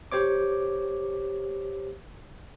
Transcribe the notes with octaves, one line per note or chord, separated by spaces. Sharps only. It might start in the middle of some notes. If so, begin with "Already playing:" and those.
G4 C5 C#5 D6